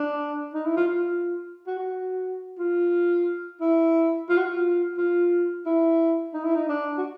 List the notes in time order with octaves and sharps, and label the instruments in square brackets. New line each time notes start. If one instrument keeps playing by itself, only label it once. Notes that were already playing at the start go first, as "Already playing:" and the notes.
Already playing: [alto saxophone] D4
D#4
E4
F4
F4
F#4
F#4
F4
E4
F4
F#4
F4
F4
E4
D#4
E4
D#4
D4
F#4